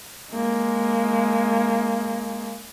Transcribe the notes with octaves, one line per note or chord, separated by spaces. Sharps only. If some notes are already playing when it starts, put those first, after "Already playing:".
G#3 A#3